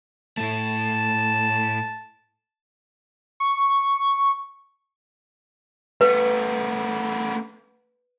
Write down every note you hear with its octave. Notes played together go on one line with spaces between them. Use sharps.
A2 A3 A5
C#6
A3 B3 B4